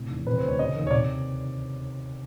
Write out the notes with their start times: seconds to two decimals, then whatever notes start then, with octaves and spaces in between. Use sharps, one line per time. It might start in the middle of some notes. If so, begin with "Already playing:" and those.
Already playing: A2 C3
0.11 E2
0.27 C3 B4
0.37 C5
0.43 D2
0.48 C#5
0.59 C#3 D#5
0.75 D#2
0.87 C#5
0.91 C3 D5